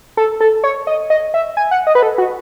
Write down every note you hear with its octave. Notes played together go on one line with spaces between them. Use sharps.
A4
A4
C#5
D#5
D#5
E5
G#5
F#5
D#5
B4
A4
F#4